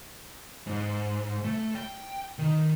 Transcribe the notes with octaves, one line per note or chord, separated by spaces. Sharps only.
G#2
A3
G5
D#3